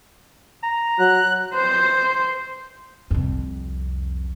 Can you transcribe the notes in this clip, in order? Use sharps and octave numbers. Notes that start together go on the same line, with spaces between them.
A#5
F#3 F#6
C5
C2 F2